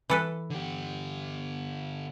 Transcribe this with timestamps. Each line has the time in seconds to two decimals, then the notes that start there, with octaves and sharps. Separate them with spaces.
0.10 E3 A4 B4
0.50 D3 G4